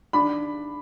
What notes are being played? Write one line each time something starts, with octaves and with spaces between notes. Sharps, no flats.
D4 B5